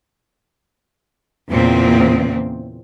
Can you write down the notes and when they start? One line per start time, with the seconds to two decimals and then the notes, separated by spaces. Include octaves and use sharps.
1.52 E2 A#2 C#3 C4